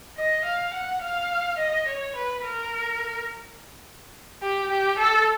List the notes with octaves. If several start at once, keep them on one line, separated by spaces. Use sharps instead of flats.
D#5
F5
F#5
F5
D#5
C#5
B4
A#4
G4
G4
A4